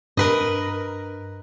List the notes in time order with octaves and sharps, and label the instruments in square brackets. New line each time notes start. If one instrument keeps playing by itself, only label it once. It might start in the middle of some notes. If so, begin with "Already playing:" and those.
[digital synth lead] G2 [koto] A#4 B4 D#5